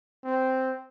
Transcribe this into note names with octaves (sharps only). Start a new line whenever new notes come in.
C4